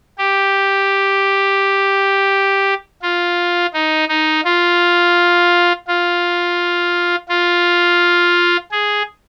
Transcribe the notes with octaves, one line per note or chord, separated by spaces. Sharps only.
G4
F4
D#4
D#4
F4
F4
F4
G#4